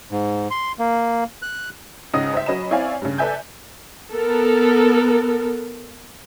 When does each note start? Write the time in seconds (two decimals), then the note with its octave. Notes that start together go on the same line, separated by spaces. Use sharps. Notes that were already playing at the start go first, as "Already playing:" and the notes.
0.11 G#2
0.51 C6
0.79 A#3
1.42 F#6
2.13 C#2 G#2 C#3 D#5 D#6
2.34 C5 E5
2.46 F#3 C#4 D#5 B5 E7
2.71 C4 E4 C#5 D5 F5 G#5
3.02 G2 C#3
3.18 A4 B4 D5 E5 G#5 G6
4.12 B3 A4 A#4